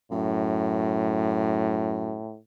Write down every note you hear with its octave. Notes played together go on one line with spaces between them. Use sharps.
F#2 A2